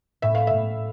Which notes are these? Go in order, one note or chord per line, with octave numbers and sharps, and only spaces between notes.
A2 E5
F5
E5
A2